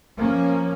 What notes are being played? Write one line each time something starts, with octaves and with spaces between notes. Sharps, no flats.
F3 A#3 C#4